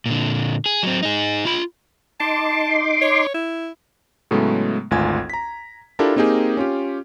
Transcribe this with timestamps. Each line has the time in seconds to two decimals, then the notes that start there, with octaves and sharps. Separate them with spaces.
0.06 A#2 D3
0.66 G#4
0.83 F#3 C4
1.03 D#4 G#4
1.45 F4 B5
2.20 D#4 A5 C6 D6
3.01 C#5
3.34 E4
4.31 A2 C#3 F#3 G#3 A3 B3
4.91 G#1 D2 F4 G#5 G#6
5.30 A#5 B6
5.99 D4 E4 F4 G4 A4 A#4
6.16 A#3 C4 D#4 G4 G#4 A#4
6.57 C#4 F4 G4